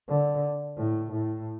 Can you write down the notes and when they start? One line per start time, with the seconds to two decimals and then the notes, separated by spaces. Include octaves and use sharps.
0.08 D3
0.77 A2
1.12 A2